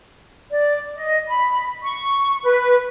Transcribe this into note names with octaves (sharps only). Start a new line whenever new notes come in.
D5
D#5
B5
C#6
B4